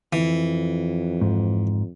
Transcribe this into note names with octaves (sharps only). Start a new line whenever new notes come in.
F2 E3
G#2